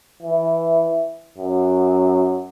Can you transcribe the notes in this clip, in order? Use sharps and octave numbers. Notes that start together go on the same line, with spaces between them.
E3
F#2